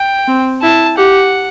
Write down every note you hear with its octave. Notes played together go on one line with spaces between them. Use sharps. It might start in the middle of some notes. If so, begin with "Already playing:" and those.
Already playing: G5
C4
E4 A5
G4 F#5